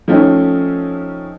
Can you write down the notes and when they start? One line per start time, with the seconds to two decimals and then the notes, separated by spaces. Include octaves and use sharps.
0.08 F3 A3 C4 C#4 D#4